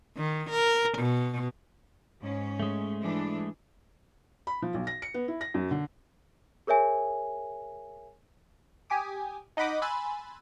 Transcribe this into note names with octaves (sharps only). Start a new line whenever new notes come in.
D#3
A#4
B2
G#2 C#4
G#3 A3
E3 D4
B5
F3
B1
A#6
C#7
B3
E4
A#6
F#2
D3
G#4 A#4 C#5 E5 G#5
G4 G#5 D6 D#6
D#4 D#5 F#5 B5 D6 D#6
G#5 B5 C6 E6 F#6 A6